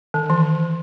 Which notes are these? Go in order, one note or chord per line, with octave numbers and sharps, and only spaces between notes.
D#3
E3